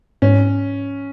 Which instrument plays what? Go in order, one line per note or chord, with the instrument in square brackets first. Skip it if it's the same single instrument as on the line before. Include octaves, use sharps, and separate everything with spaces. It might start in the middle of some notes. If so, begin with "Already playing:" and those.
[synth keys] G#2 [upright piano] C#4